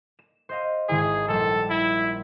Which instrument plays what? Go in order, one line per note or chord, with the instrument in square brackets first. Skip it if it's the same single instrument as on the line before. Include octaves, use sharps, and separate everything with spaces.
[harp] E7
C5 D#5 F5
[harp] G#1 D#3 E4 [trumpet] G#4
[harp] A#1 G3 [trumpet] A4
[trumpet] E4